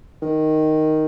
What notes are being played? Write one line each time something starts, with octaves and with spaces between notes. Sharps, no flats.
D#3